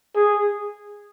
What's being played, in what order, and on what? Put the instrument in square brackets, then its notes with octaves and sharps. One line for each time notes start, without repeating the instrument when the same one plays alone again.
[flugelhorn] G#4